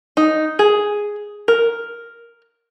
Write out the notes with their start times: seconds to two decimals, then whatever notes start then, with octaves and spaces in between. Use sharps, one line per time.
0.17 D#4
0.59 G#4
1.48 A#4